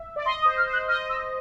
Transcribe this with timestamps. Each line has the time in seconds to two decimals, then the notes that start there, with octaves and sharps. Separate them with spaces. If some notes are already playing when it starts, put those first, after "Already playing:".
Already playing: E5
0.16 D5
0.25 D#5 C6
0.41 D#6
0.45 C5
0.57 F6
0.67 C5
0.73 F#6
0.87 D#5 F6
1.09 E6